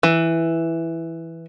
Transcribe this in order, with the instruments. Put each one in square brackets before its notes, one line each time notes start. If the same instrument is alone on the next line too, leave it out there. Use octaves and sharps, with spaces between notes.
[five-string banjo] E3